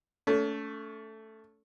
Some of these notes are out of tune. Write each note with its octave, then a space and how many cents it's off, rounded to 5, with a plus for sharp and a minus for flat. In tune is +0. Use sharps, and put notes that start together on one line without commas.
A3 +0 C#4 +35